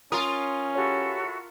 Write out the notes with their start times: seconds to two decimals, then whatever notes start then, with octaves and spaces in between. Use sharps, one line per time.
0.12 C#4 F4 A#4 C6 D#6
0.75 E4 F#4 G4 A4 C#5